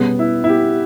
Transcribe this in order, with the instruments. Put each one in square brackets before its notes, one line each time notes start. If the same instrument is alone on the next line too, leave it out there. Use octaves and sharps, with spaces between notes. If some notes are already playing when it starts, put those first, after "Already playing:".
Already playing: [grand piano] B2 G3 C#4 G#4 B4 [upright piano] B3
[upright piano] E4
E4
G4